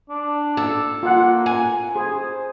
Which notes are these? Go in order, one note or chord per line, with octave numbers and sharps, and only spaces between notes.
D4
A4
A#3 F4 F#5
G#5
G#4 C5